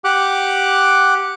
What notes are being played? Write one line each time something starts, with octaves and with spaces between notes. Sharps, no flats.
G4 F#5 D6 F#6